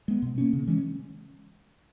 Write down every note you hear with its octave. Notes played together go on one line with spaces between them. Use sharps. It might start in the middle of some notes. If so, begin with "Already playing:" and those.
G#3 B3
B2
A#3 C#4
C#3
E3 G#3 C#4